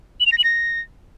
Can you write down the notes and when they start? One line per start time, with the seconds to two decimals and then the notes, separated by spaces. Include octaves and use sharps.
0.20 F#7
0.26 F7
0.32 A#6
0.38 F#7
0.44 A#6